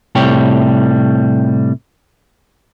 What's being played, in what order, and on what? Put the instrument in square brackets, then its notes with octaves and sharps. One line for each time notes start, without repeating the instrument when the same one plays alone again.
[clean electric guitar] A2 C3 G3 C#5 G5